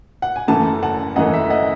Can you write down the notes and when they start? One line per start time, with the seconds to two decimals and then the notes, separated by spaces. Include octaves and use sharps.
0.22 F#5
0.36 G#5
0.48 F#2 C#3 E3 A3 F#5 A5
0.83 F#5 A5
1.16 F#2 C#3 E3 A3 D#5 F#5
1.33 E5
1.50 D#5 F#5